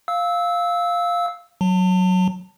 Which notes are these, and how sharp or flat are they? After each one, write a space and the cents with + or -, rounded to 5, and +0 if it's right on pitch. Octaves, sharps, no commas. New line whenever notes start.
F5 +0 E6 -15
F#3 +0 A5 +30